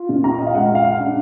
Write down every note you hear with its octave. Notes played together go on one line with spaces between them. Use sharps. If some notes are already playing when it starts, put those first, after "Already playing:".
Already playing: F4
A#2
A#5
D#5
F5
G#3 F#5
F5
F#5
D4